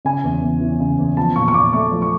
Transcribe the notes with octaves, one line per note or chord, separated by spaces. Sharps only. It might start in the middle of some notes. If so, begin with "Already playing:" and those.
C#3 G#5
E2
E2
E3
C#3
E2
F3 A5
A#2 C#6
C#6
A#2 D6
A3 C#6
F3
C#6